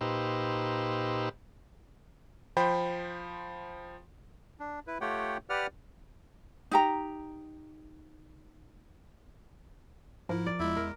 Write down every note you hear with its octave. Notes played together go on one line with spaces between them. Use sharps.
A#2 D#4 G4 B4 C5 E6
F3 C5 G5 B5
D4
E4 B4
A3 F4 G4 C#5 F#5 G5
G4 B4 D5 F#5 F6
D#4 G4 A#5
G#2 F3 E4 A#4
D5
E2 G#3 E4
A#4